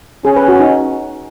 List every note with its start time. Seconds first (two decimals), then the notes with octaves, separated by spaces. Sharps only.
0.25 C#4 G#4
0.36 B4
0.48 F#4
0.60 D#4